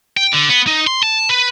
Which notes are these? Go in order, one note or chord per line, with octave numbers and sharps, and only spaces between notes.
G5
D3
B3
D#4
C6
A5
B4